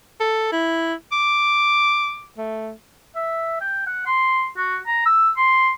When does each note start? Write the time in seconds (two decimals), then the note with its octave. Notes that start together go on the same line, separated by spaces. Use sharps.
0.20 A4
0.52 E4
1.12 D6
2.37 A3
3.16 E5
3.61 G5
3.87 F#5
4.06 C6
4.57 F#4
4.86 A#5
5.06 E6
5.37 C6